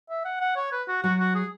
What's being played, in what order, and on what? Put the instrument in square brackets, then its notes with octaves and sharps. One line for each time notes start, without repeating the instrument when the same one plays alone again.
[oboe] E5
F#5
F#5
C#5
B4
F#4
[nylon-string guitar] F#3 [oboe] F#4
[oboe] F#4
G#4